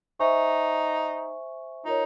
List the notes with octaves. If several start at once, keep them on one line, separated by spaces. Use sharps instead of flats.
D#4 C5 E5 G#5 C#6
D#4 F4 A#4 C#5